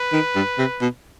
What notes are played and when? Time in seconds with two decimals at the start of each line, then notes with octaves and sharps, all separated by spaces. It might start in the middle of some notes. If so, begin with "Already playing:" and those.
Already playing: B4
0.12 D#3
0.35 G2
0.58 C3
0.81 B2